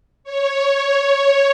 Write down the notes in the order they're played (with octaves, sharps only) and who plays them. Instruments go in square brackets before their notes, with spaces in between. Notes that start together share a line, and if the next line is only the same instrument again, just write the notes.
[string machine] C#5